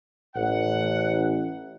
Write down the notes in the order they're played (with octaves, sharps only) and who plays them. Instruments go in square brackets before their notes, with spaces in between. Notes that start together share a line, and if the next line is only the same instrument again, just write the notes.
[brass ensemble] A1 [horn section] F#5